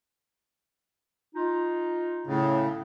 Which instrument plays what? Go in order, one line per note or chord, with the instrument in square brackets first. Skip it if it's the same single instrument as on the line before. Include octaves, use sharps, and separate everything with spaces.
[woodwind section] D#4 F4
[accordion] A2 C#3